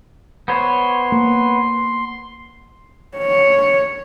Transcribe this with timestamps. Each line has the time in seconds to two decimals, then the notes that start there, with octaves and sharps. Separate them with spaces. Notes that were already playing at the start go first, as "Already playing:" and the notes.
0.48 B3 C5 C#5 C6
1.12 A#3
3.18 C#5